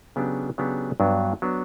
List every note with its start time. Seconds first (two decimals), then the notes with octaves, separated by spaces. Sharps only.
0.16 C#3 F#3 B3 D4 G4
0.58 C#3 F#3 B3 D4 G4
1.00 G2 F#3 B3 D4
1.42 F#3 B3 D4